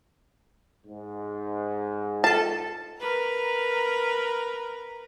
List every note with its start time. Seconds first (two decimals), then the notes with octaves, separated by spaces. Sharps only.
0.85 G#2
2.24 F4 A4 A5
2.98 A#4 B4 A#5